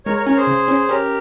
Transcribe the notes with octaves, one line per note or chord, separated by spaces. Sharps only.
G#3 A#4 C#5
A#4 C#5
C#4 A#4 C#5
G#4 C5
C#3
C#4
C#4 G4 A#4